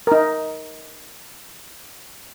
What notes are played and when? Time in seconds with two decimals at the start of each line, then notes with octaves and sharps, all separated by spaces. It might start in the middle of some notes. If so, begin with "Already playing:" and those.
0.07 D#4 A#4